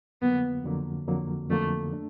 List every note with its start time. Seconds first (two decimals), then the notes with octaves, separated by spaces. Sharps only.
0.22 F2 D3 F#3 A#3 B3
0.64 F2 D3 F#3 A#3
1.08 F2 D3 F#3 A#3
1.50 F2 D3 F#3 A3 A#3
1.93 A3 D4